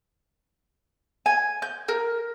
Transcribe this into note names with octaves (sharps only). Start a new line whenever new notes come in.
G#5
G6
A#4